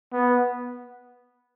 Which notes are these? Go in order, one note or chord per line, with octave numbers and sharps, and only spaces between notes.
B3